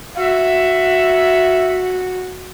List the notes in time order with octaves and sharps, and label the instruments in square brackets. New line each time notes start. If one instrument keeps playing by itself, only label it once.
[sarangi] F#4 [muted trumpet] E5